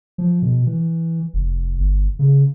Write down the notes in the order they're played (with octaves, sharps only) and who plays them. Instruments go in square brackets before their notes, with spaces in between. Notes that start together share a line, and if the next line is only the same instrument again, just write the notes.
[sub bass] F3
B2
E3
F1
G1
C#3